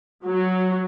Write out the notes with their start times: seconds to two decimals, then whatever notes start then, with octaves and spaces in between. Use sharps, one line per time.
0.25 F#3